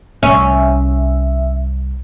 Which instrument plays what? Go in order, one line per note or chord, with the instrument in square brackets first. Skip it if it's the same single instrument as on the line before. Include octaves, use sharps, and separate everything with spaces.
[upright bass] C2 [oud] C#4 [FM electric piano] E5